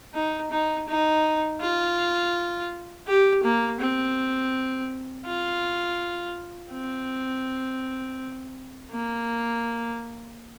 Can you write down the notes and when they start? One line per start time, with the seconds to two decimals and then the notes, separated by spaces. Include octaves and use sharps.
0.14 D#4
0.52 D#4
0.88 D#4
1.61 F4
3.07 G4
3.44 A#3
3.80 C4
5.26 F4
6.72 C4
8.91 A#3